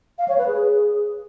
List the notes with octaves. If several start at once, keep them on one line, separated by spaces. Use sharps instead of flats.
F5
C#5
B4
G#4